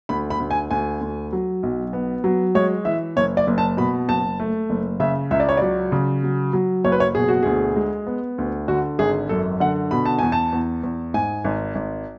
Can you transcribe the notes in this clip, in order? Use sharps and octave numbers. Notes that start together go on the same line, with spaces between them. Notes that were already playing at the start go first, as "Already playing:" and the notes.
D2 B5
B5
D2
G#5
D2 G#5
D2
F#3
B1
B3
F#3
G#3 C#5
E3 E5
F#1 C#5
D5
F#1
A5
B2 B5
F#1 A5
A3
F#1
C#3 E5
C#2 E5
D5
C#5
F#3 D5
C#3
F#3
F#3
F#1 C#5
B4
C#5
B2 G#4
F#4
D2 G#4
G#3
B3
D2
D3 F#4
G#1 G#4
F#2 A4
D3 F#5
B2 B5
A5
E2 G#5
A5
E2
E2
G#2 G#5
G#1
G#1